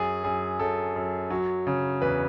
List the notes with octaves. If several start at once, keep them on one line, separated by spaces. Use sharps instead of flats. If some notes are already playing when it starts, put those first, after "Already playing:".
Already playing: F#2 G#4
F#2 G#4
F#2 A4
F#2
F#3
C#3
E2 B4